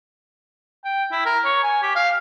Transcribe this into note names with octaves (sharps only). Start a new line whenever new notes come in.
G5
E4
A#4
C#5
G#5
G4
F5